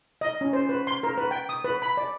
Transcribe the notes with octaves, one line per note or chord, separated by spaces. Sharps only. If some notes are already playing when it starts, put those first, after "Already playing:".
D#5
C#4
C5
B4
C6
A#4
B4
G5
D#6
B4
B5
D5